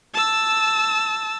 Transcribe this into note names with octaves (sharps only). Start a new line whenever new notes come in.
A5 E6